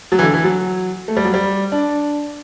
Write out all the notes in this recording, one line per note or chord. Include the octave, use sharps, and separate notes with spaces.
F#3
E3
D3
E3
F#3
A3
G3
F#3
G3
D4